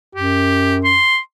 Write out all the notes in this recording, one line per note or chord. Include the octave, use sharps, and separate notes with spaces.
F#2 G4
C6